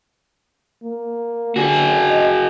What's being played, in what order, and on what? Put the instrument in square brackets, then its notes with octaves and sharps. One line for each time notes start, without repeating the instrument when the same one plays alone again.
[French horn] A#3
[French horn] D3 [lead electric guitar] F#4 G#4
[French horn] D#5